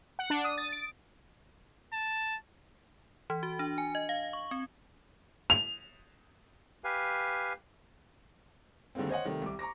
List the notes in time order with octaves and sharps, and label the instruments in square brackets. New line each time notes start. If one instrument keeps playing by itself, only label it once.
[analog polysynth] F#5
D4
D#6
A6
D7
[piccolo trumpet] A5
[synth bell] E3
F#4
D4
G#5
D#5
F5
C#6
C4
[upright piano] F7
[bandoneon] G4 B4 F5 G#5
[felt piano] D3 D#3 G3 G#3 A#3 C4
C5 C#5 D#5 F#5
C3 D#3 G3 A3
C2 D6
A#5 C#6 D6 A#6